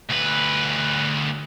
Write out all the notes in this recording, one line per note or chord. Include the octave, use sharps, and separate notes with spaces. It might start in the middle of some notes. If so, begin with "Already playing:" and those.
D2 B4